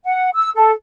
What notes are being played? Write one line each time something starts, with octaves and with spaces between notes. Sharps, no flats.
F#5
E6
A4